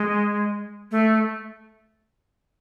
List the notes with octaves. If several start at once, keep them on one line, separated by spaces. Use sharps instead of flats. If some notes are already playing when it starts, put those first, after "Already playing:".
Already playing: G#3
A3